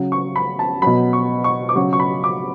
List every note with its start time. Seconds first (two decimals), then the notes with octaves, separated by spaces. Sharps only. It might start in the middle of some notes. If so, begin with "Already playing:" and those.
Already playing: C#3 F#3
0.12 C#6
0.36 B5
0.59 A5
0.82 B2 F#3 B5
1.13 C#6
1.44 C#6
1.69 D6
1.76 C#3 F#3 C#6
1.93 C#6
2.00 B5
2.24 D6